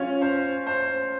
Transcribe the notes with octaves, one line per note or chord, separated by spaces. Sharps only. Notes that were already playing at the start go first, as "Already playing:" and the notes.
Already playing: C#4 F4
C5
C5